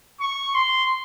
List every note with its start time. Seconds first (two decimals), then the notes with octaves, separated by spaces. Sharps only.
0.21 C#6
0.55 C6